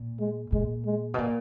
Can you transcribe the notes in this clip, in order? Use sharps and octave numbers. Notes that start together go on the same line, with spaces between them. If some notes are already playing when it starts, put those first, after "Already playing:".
Already playing: A#2
G#3
A#2 G#3
G#3
B2
A#2